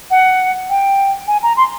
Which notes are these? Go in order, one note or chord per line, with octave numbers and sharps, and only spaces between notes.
F#5
G5
G#5
A#5
C6